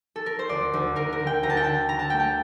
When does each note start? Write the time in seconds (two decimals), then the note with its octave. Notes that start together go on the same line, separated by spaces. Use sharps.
0.16 A4
0.26 A#4
0.39 C5
0.49 D2 D5
0.73 D2
0.96 D2 A#4
1.12 A#4
1.20 D3
1.27 G5
1.43 D2 A#5
1.50 A5
1.57 G5
1.64 D3 A5
1.89 D3 A#5
1.99 A5
2.10 A3 G5
2.20 A5